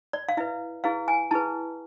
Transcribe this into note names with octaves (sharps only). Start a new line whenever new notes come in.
D5
F5
E4 B4 E5
E4 G#4 B4 F5
G#5
E4 G#4 B4 A5